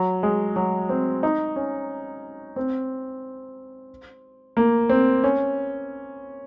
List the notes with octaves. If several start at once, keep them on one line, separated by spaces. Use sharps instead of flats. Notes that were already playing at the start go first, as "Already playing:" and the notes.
Already playing: F#3
G#3
F#3
C4
D#4
C#4
C4
A#3
C4
C#4